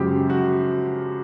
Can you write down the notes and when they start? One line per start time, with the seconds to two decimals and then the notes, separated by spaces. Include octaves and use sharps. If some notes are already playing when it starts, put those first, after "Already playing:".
Already playing: F#2 C#3 F3 G#3 F#4 G4
0.30 F#4